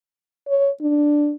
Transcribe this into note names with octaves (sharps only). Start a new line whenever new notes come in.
C#5
D4